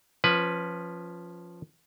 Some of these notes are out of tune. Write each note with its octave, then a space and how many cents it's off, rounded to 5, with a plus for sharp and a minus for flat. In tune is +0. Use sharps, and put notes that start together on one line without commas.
F3 +0 C#4 -15 B4 +0